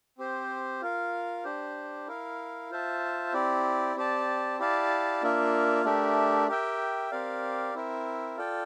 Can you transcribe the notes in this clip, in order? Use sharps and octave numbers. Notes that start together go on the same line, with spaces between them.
C4 G4 C5
F4 A#4 F5
D4 G4 C5
E4 A#4 F5
F4 C5 E5 A5
C4 E4 G4 D5
C4 G4 D5 A5
E4 G4 D5 F5 A5
A#3 D4 F4 A#4 E5
A3 D4 G4 A#4 E5
G4 A#4 E5 G5
C4 G4 A#4 D5 F5
C4 E4 A#4 E5
F4 A4 D5 G5